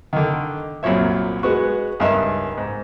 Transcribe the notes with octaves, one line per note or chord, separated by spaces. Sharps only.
D3 D#3
C2 F#2 A#2 C#5 E5
G#3 B3 F#4
C#2 G2 D#4 A#4 E5
G#2